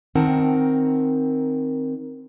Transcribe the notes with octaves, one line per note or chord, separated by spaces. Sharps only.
D#3 C4 D#4 A#4 F#5 A5